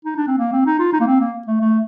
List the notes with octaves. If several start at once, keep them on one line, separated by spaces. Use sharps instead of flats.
D#4
D4
C4
A#3
C4
D#4
F4
D#4
A#3
C4
A#3
A3
A3